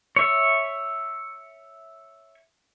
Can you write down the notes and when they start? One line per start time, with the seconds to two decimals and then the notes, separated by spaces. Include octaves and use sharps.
0.16 C#5 E5